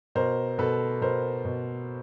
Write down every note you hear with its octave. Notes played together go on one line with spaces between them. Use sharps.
B2 A#4 C5
B2 A4 B4
B2 A#4 C5
B2